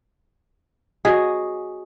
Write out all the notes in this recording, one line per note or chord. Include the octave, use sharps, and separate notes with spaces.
F#4 G#4 D#5